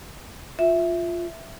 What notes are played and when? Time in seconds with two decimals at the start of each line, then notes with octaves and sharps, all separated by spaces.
0.59 F4 E5